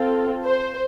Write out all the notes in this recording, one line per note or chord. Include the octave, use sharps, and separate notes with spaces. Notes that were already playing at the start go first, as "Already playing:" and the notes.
Already playing: C4 F4 A4
C5